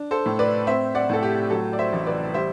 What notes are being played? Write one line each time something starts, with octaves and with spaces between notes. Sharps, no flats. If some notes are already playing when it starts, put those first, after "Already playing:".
Already playing: D4
A4 C5
A2
B4 D5
C4 C5 E5
D5 F#5
A2 A4
G4
F#3 A4
D5
C5 E5
A1
B4 D5
G3 C5 E5